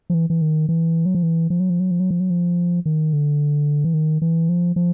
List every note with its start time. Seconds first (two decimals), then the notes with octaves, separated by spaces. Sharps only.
0.10 F3
0.14 E3
0.30 E3
0.42 D#3
0.69 E3
1.06 F#3
1.15 F3
1.23 E3
1.50 F3
1.60 F#3
1.70 F3
1.80 F#3
1.91 F3
2.00 F#3
2.11 F3
2.20 F#3
2.30 F3
2.86 D#3
3.13 D3
3.84 E3
3.94 D#3
4.22 E3
4.49 F3
4.76 F3